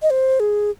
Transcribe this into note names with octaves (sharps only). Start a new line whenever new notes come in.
D#5
C5
G#4